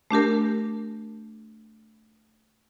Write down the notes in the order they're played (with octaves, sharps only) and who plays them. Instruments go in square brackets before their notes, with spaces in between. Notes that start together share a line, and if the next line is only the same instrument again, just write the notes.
[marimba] A3 D4 G4 A#4